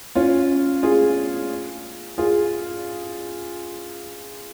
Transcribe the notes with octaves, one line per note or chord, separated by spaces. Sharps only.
C#4 F4
F4 G#4
F4 G#4